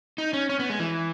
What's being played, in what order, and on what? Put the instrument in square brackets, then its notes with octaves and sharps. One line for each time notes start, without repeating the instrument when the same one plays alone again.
[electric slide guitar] D#4
C#4
C#4
B3
G#3
E3